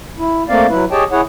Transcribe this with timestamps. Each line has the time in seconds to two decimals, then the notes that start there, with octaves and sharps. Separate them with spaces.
0.18 E4
0.49 A3 A#3 C4 D5 F5
0.69 F#3 E4 B4
0.91 G4 G#4 C#5 D#5 G5 A5
1.12 E4 G#4 C#5 F#5